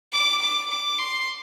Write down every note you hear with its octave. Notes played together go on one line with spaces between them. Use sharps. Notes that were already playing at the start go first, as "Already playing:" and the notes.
D6
D6
D6
C6